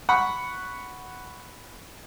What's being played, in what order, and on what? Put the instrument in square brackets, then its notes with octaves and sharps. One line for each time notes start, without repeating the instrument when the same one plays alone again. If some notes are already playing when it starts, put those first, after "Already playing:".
[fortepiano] F#5 B5 C#6